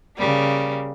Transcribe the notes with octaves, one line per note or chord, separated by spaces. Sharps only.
C#3 G3 A#3